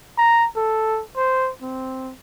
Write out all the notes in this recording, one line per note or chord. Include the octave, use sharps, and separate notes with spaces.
A#5
A4
C5
C4